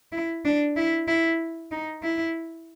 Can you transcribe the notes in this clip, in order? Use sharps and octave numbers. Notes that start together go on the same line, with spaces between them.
E4
D4
E4
E4
D#4
E4